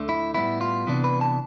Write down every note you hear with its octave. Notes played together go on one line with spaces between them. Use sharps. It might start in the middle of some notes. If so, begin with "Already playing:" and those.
Already playing: D2 D3 A3
E4
A2 G3 B3 E4
F4
C3 E3 B3 D4
B4
A5